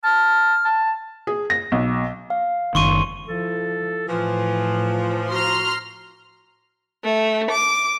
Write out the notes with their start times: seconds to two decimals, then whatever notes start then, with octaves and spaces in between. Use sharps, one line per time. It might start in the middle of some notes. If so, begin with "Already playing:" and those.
0.04 A5 F6
0.65 A5
1.27 G#4
1.50 A#6
1.72 B1
2.30 F5
2.75 F#1 D#3 C6 C#6 D#7
3.27 F3 E4 A4
4.09 A2 E3 F3 E4
5.30 F#4 A#5 C6 F6
7.04 A3
7.51 D6